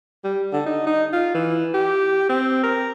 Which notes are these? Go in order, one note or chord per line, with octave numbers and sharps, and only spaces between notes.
G3
D3
D#4
D#4
F4
E3
G4
C4
A#4